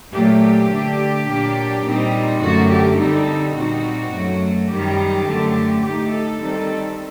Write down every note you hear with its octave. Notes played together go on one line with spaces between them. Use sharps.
A#2 F#3 A3 G4
D3 A3 D4
A#2 F#3 A#3 D4
A#2 G3 C4 D#4
F#2 D3 A3 F#4
G4
D3 G3 C4 D#4 A4
A#2 G3 C4 D#4 F#4
F#2 F#3 A3
F#2 D#3 G3 G4
F#2 D3 A3
A2 A3 D#4 G4
A4
D#3 G3 C4 D#4